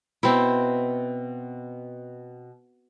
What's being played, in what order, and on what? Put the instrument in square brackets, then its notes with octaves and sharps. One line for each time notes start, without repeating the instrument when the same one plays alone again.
[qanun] B2 [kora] C4 E4